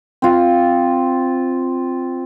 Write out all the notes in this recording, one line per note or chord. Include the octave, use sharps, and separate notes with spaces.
C4 F4